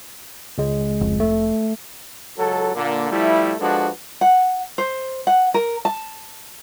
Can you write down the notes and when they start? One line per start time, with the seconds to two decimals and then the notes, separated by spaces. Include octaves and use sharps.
0.58 C#2 G#3
1.01 F1
1.20 A3
2.37 C#2 F#3 A4
2.74 A#2 D3 A#3
3.10 F3 G3 A3 E4
3.59 F3 G#3 D4 F#4 A4 B4
4.21 F#5
4.78 C5
5.27 F#5
5.54 A#4
5.85 A5